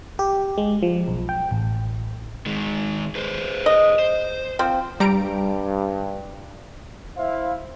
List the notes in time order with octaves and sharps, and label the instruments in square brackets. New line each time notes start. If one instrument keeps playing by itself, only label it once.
[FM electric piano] G4
G#3
F3
B1
G5
A1
[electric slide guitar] D#3 G#3
G#4 B4 C5
[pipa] D#5
[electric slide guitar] C5
[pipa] F3 C4
[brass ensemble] G2 [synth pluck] G3 A#5 D7
[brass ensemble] E4 C5 F5